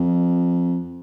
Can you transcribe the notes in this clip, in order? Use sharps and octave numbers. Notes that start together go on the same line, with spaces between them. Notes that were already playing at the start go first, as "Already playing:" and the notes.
Already playing: F2